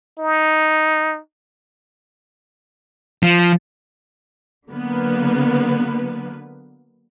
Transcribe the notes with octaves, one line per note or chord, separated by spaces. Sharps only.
D#4
F3
D3 F#3 A#3 B3 B4